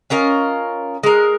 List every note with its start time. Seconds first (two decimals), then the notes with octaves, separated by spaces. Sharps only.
0.10 C#4 F4 A#4 D#5
1.03 G#3 A#4